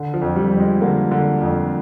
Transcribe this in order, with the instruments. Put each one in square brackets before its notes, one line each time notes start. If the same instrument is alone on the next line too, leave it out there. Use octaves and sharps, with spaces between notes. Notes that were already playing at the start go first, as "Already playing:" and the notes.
Already playing: [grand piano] D3
F3
F2
G3
F2
G#3
D3 A#3
D3
F2